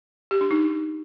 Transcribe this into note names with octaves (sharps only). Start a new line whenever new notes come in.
G4
D4
D#4